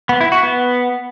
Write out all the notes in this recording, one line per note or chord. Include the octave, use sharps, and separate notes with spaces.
B3
E4
F#4
B3